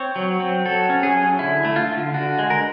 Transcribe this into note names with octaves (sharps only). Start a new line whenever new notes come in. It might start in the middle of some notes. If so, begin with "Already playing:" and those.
Already playing: C4 C#5
F#3
C4
F#3 A4
C#4
G#4
F#3
D3 E4
A3
F4
D3
D3 F#4
G#3
A#4